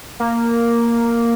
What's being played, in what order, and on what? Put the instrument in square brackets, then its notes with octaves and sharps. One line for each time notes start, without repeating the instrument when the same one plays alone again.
[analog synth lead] A#3